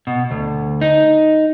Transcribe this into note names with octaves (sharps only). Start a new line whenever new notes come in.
B2
D2
D#4